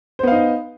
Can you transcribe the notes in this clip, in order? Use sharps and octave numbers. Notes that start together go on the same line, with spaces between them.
B3 D#4 C5 F5